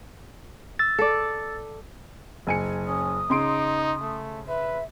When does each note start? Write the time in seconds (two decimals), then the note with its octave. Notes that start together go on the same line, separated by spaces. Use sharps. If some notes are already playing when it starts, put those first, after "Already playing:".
0.79 E6 A6
0.99 A4 D5
2.47 F#1 G#5 C#7
2.87 C#4 D#6
3.30 C#3 D#4 C6 D7
4.01 A3
4.48 B4 E5